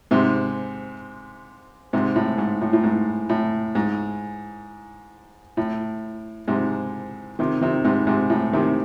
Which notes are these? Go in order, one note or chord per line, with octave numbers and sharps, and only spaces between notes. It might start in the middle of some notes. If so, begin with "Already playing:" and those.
G#2 C3
G#2 C3
A2
G#2
A2
A2
G#2
A2
G#2
A2
G#2 C3
C3 D#3
C3 D#3
G#2 C3
G#2 C3
A2
C3 D#3